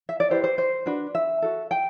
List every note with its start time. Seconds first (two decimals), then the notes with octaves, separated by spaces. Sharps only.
0.09 E5
0.20 D5
0.30 E4 G4 B4 C5
0.44 C5
0.58 C5
0.86 D4 F#4 B4
1.15 E5
1.42 F#4 A4
1.71 G5